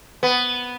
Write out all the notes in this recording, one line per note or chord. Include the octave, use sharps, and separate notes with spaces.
B3